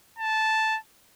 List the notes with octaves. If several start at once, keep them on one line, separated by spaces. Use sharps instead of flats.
A5